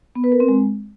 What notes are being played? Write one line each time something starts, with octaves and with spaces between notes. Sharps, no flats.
B3
B4
A#4
C4
G#3